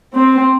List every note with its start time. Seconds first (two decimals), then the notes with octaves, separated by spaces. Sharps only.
0.15 C4